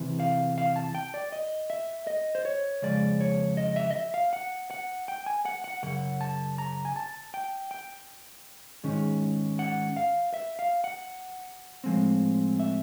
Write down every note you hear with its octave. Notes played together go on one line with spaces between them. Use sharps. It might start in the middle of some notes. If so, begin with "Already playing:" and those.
Already playing: E2 C3 E3
F5
F5
A5
G5
D5
D#5
E5
D#5
C5
C#5
F2 C#3 F3 G#3 D5
C#5
D#5
E5
D#5
E5
F5
F#5
F#5
G5
G#5
F#5
F#5
F#2 C#3 F#5
A5
A#5
G#5
A5
G5
G5
G#2 D#3 G#3 C#4
F#5
F5
E5
F5
F#5
A2 F3 G#3 C4
E5